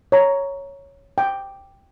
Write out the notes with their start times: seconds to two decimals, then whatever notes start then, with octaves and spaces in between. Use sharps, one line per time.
0.12 C#5 A#5
1.18 G5